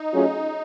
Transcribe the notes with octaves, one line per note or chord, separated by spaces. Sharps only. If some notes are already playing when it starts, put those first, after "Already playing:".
Already playing: D#4
F#3 A3 C#4 F4 G#4